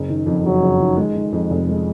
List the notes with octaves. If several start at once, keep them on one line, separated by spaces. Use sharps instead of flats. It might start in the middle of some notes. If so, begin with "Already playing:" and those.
Already playing: F#1
D#3
F2
F#1 F#3
F#1
D#3
G#3
D#3
F2
F1
G#3